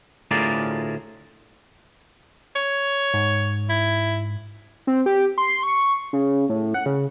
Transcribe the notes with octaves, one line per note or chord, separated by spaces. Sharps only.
D2 A2 F4 G#4 A#4 D5
C#5
G#2
E4
C4
G4
C6
C#6
C#3
A2
F#5
C#3